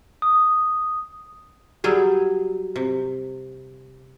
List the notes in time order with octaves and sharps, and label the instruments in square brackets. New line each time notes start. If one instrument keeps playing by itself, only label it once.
[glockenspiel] D#6
[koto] F#3 G3 G#4
C3